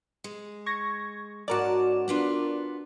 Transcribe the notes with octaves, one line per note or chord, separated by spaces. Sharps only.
G#3
C#6 G#6 A#6
G#2 C#4 F#4 A#4 D5 A5
B3 D4 F4